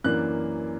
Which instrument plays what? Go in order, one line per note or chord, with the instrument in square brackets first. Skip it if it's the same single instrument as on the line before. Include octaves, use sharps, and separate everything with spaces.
[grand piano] F#2 E3 A#3 D4 F#6